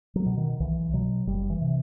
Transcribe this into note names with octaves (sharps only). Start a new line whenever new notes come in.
F#3
B2
D#3
B1 E3
B2 F#3
F#1 G3
E3
C3